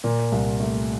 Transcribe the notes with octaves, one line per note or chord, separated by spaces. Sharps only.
A#2
C2
A3